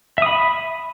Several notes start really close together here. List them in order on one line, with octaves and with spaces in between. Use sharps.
E5 D#6 B5